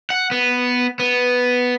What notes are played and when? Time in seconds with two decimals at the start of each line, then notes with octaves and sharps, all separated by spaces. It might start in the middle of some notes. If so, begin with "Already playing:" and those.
0.10 F#5
0.32 B3
0.99 B3